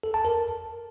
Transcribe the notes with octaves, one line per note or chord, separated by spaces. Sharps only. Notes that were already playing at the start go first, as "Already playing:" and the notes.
A4
A5
A#4